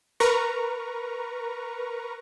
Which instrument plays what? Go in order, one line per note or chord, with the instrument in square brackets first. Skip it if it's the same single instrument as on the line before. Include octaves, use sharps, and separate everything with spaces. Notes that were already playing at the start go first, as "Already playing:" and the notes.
[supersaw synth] A#4 B4 A#5 C#6